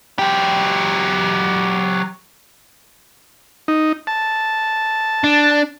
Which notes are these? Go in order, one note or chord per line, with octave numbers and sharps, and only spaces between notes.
F#3 G4
D#4
A5
D4